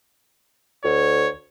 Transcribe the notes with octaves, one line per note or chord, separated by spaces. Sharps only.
D2 C#5